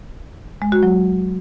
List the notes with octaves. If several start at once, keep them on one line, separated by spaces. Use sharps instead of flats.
G#3
F#4
F#3